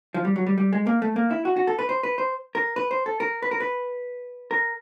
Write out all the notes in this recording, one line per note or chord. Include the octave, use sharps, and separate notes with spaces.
F3
G3
F#3
G3
G3
G#3
A#3
A3
A#3
E4
F#4
F#4
A4
B4
C5
B4
C5
A#4
B4
C5
A4
A#4
B4
A#4
B4
A#4